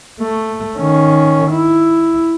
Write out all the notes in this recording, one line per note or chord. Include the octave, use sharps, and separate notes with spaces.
A3
D#3 C#4
E4